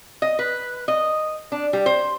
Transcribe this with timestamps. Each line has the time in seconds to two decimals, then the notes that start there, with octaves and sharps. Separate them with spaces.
0.22 D#5
0.39 B4
0.88 D#5
1.52 D4
1.73 G3
1.86 C5